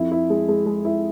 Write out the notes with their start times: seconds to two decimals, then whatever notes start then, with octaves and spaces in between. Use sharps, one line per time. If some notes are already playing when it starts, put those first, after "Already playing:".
Already playing: F2 E4
0.11 E4
0.30 G#3
0.48 G#3
0.66 G#3
0.85 E4